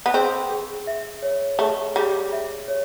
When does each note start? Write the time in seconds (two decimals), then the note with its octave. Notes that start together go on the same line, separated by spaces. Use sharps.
0.06 B3
0.14 C4 G#4
0.51 G#4
0.87 E5
1.22 C#5
1.59 A3 G#4
1.96 G3 G#4
2.33 E5
2.68 C#5